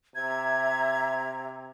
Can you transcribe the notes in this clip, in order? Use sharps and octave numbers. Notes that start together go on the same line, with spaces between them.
C3 E5 A#5 G#6